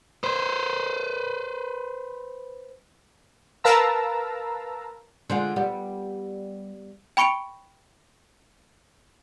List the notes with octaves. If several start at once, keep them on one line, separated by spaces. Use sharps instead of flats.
B4 C5
A#4 B4 F5 A5 A#5 E6
D3 G#3 F4 C5 F#5
G3 B3
G5 B5 C#6 C#7 D7 F7